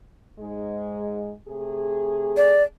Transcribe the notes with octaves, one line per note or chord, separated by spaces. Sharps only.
G#2 G#3
C3 A3 G#4
D5